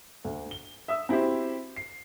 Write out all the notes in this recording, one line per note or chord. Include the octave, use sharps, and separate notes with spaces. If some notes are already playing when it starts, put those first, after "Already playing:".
D2
G7
E5 D#6 E6
C4 E4 F#4 G4 C5
C7